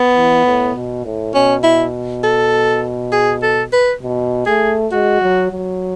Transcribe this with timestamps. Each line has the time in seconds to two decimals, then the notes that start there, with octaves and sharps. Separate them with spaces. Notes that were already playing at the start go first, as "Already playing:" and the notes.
Already playing: B3
0.15 E3
0.45 A2
0.74 B2
1.04 A2
1.34 B2 C#4
1.64 E4
2.23 A4
3.12 G#4
3.42 A4
3.72 B4
4.02 B2
4.46 A3 G#4
4.92 G#3 F#4
5.22 F#3
5.51 F#3